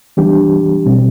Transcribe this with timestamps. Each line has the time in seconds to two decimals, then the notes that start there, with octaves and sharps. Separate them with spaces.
0.17 E3 G3 B3 D4 G4
0.86 B2 G3 C4